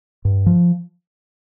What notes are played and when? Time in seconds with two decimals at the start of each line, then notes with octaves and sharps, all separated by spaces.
0.25 G2
0.46 F3